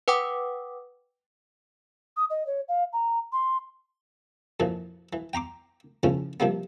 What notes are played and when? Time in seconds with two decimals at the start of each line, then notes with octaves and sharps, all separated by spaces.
0.08 B4 F#5 G5 D6 D#6
2.17 D#6
2.30 D#5
2.47 C#5
2.68 F5
2.93 A#5
3.32 C6
4.60 F2 A#2 E3 F3
5.13 E3
5.33 G5 A#5 C6 D6
6.03 A2 C#3 F3 C#4 F4
6.40 C3 F3 G3 A#3 B3